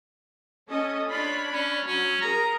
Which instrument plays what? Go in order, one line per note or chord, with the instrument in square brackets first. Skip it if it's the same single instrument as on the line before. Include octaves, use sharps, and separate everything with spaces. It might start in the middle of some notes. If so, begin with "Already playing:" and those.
[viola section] C#4 A4 D#5
[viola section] D4 C#5 B5 [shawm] F4
[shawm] C#4
[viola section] F#3 [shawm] C#4
[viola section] G#4 A#4 [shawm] A#5